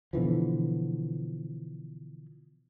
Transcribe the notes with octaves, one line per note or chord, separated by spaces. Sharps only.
B2 D3 E3 F3